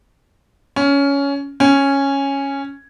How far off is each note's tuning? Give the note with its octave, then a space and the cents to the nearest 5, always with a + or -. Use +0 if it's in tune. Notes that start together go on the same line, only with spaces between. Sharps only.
C#4 +15
C#4 -5